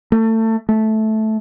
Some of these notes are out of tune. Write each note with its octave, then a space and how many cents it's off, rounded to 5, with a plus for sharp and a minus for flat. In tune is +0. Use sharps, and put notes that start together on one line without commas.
A3 +25
A3 -10